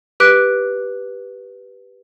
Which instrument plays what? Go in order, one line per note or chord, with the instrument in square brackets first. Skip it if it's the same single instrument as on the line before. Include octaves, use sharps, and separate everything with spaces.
[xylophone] G4 B4 D6 F#6 B6 D7